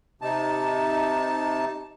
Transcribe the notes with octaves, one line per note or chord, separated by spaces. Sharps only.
C3 D#4 A5